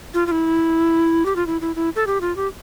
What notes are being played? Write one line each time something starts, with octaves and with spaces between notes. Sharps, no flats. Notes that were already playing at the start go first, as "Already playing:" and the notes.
F4
F4
E4
G4
F4
E4
E4
E4
A4
G4
F4
G4